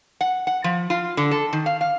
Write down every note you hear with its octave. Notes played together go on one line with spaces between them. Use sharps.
F#5
F#5
F3
F4
D3
A4
D#3
F5
F5